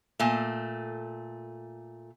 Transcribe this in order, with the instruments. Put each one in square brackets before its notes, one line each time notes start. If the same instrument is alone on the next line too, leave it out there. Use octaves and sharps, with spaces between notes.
[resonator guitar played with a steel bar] A#2 A3